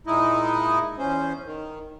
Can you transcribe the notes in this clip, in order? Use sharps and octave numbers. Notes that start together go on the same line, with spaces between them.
A#2 G#3 D#4 E4 D#5
E2 C#4 C5
D#3